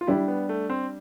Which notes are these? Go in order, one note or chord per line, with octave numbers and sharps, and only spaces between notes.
F4
G3 D4 E4 G4
B3
A3
C4